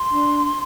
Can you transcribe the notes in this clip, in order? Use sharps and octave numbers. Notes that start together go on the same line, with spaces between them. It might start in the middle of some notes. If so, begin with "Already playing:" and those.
Already playing: C6
D4